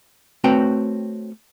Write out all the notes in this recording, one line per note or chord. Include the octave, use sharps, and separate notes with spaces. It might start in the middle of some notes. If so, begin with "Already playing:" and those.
A3 C4 F#4 B4 C#5 G5